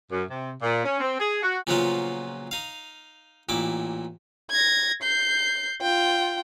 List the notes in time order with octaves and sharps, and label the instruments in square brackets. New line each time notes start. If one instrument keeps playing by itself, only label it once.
[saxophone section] F#2
C3
A#2
C#4
C4
G#4
F#4
[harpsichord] A#2 C#3 F3 F#3 B3 F4
D#4 F5
A1 A#2 E4 D6
[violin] G#6 A#6
G6 C7
F4 G5